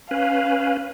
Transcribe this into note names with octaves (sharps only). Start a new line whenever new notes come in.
C#4 B4 F5